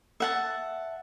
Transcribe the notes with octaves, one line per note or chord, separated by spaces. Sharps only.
E5 F#5 A5